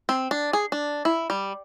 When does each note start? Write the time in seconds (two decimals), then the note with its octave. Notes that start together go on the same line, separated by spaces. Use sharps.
0.09 C4
0.31 D4
0.53 G#4
0.72 D4
1.05 E4
1.30 G3